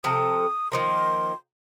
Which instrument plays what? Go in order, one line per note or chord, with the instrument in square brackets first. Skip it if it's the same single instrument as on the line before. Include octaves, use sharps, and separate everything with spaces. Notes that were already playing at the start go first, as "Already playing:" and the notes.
[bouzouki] C3 F3 A4 [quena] D#6
[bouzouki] D#3 F3 A#3 [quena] C6